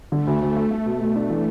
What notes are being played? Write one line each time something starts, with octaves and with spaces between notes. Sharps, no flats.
D3 A3
D2
D2
A3
A3
B2
B2
D4
E3